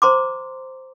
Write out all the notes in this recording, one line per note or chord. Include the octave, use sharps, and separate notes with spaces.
C5 A#5 C6 D6